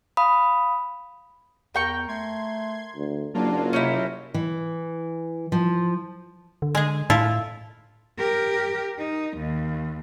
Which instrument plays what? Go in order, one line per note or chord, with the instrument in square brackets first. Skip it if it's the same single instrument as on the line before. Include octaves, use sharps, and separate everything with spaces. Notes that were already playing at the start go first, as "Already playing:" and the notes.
[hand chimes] F5 B5 D#6
[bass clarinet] E2 [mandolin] A#4 G5 C#6
[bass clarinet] A3 [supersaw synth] C6 G#6
[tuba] D2
[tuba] F#1 [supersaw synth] F#3 A#3 F4 [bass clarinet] D4
[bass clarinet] C3 [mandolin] C#4 D#4 E4
[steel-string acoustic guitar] E3
F3
[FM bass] D3
[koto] G#3 G#4
[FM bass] A2 [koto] E4 F4 A4
[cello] G4 A#4
D#4
D#2